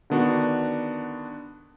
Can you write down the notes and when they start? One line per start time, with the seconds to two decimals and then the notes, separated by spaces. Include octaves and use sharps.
0.10 D3 D#3 B3 D4 F#4